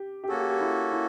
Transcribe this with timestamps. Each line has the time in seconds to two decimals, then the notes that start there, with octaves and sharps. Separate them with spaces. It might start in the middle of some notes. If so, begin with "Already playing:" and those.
Already playing: G4
0.24 G4
0.28 A#3 C#4 F#4 G#4 A4
0.39 G4
0.50 G4
0.61 E4
0.92 E4